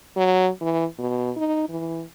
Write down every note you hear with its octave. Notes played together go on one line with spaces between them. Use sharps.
F#3
E3
B2
D#4
E3